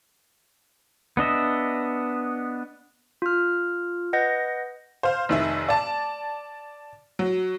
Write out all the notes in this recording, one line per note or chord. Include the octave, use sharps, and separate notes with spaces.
B3 D4 D#5 E5
F4 F6
B4 D#5 F#5 G6 A#6
C5 F5
F1 D#3 E5
D5 A5
F#3